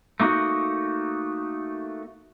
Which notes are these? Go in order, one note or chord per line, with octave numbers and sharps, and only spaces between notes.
A3 A#3 D#4 F#4